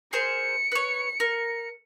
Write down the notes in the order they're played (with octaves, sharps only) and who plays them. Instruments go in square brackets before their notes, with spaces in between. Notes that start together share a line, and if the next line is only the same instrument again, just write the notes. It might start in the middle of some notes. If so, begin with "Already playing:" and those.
[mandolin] G#4 A#4 C5 [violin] C#7
[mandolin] B4 C#5
A#4